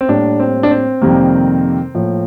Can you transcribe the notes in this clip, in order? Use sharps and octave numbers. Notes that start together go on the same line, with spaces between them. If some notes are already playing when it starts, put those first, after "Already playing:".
C4
A2 G3 A#3 D4
C4
D4
C4
F2 C3 D#3 G3 A#3
A2 F3 A#3